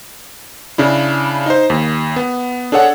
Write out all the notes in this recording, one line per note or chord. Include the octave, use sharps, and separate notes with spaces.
C#3 D4 E4
D#4 C5
D#2
B3
D4 G#4 A4 C#5 F#5